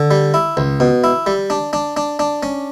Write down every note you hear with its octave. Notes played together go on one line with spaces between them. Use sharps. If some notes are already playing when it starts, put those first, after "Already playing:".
Already playing: D3
G3
E4
C#2
B2
E4
G3
D4
D4
D4
D4
C#4